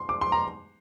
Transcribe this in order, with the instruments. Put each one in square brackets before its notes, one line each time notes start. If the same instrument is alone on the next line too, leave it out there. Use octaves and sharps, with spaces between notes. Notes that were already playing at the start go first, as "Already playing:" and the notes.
Already playing: [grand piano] C6
D6
C6
A#5